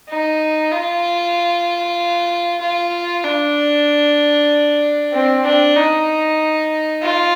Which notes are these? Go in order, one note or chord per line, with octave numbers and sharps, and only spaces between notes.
D#4
F4
F4
D4
C4
D4
D#4
F4